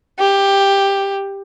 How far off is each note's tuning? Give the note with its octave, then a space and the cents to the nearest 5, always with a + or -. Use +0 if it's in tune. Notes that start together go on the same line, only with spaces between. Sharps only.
G4 +10